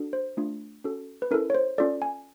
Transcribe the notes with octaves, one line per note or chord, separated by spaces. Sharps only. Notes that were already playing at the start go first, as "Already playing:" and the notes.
Already playing: D4 F#4 A4
C5
A3 D4 F4
C#4 F#4 A4
B4
C#4 E4 A4 A#4
C#5
C5
C#4 F4 A4 D5
G#5